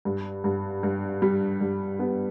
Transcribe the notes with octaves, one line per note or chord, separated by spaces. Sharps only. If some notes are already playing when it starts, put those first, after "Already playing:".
G2
G2
G2
G3
G2
B3